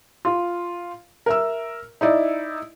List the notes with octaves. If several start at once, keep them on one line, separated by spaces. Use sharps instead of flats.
F4
A#4 E5 E6
D#4 E4 D5